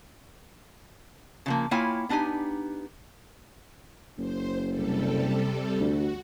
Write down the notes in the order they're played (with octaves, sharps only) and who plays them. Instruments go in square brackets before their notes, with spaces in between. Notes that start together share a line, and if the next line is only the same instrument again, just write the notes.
[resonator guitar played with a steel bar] C#3 F3 A#3
A#3 E4 F4 C#5 G5 G#5
B3 D4 D#4 G4 G#5
[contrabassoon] F#1 [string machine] C5
[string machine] C3 G3 A4
[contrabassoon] D2 [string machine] F#4